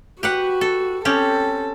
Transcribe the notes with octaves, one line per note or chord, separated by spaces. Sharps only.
F#4 G4 B4 F#5
A4
C4 C#4 G4 A4